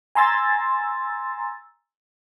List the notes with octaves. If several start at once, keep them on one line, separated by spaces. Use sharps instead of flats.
G#5 A#5 C6 E6 A6